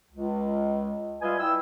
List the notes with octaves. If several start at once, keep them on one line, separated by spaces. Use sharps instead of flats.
C#2
G3 F4 B4 D#5 E5 G#5
E4 G5 E6